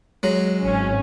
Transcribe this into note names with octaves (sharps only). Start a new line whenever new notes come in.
F#3 G#3
G#1 C#4